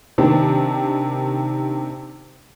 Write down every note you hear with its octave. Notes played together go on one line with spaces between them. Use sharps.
C3 D#3 D4